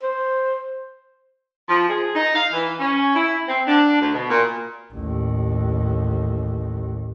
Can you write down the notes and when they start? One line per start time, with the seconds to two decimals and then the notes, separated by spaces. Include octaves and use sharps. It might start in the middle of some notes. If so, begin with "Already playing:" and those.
0.03 C5
1.68 F3
1.89 G#4
2.14 D#4
2.34 F5
2.52 E3
2.79 C#4
3.14 E4
3.47 C4
3.66 D4
4.00 D2
4.13 B2
4.29 A#2
4.92 A1 D#2